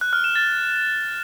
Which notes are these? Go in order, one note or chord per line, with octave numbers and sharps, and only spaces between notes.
F#6
F6
E7
A6